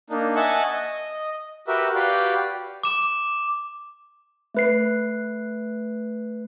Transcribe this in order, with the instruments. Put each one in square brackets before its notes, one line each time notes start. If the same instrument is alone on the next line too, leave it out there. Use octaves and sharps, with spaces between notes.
[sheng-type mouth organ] A#3 D4 D#4
D#5 E5 F#5 G#5 A5 C#6
D#5
F#4 G4 A#4 B4 E5
F#4 G4 B4 D5 F5 G5
[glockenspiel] D6 E7
[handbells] A3 B4 C7